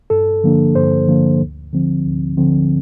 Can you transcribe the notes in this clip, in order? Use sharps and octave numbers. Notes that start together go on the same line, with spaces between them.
G2 A4
D3 F3 A#3 D4
G2 C5
D3 F3 A#3 D4
D2
D3 F3 C4
D2
D3 F3 C4